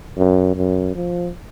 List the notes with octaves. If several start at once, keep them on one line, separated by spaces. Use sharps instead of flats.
F#2
F#2
F3